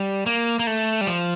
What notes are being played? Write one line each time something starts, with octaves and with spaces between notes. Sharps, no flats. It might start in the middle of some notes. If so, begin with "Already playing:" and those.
Already playing: G3
A#3
A#3
A3
G3
F3